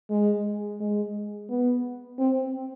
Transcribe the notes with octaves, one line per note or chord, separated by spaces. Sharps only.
G#3
G#3
B3
C4